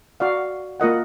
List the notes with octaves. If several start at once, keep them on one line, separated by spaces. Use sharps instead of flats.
F#4 D5 F5
A#3 F4 A#4 D#5 F#5